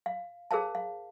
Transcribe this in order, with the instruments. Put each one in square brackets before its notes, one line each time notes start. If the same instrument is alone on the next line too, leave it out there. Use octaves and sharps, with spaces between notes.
[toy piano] F5
G#4 A#4 C5 F5 A5
F5